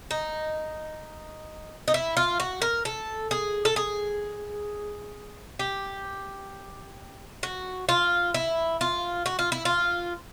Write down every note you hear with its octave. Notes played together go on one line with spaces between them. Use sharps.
D#4
D#4
E4
F4
F#4
A#4
A4
G#4
A4
G#4
G4
F#4
F4
E4
F4
F#4
F4
E4
F4